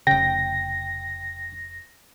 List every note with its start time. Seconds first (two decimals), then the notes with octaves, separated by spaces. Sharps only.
0.07 F1 C#3 G5 A#6